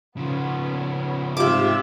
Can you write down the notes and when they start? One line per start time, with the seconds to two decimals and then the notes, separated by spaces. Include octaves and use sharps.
0.17 A#2 C#3 F3 B3 C#4
1.37 G#2 C3 G3 F4 G4 E5 D6 E6